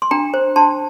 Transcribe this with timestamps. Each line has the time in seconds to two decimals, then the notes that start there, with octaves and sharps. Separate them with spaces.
0.02 C6
0.11 D4 G5 A#5
0.34 C5
0.56 D4 A5 C6